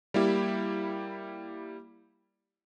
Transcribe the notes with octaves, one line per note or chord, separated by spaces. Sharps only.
G3 A#3 E4 G4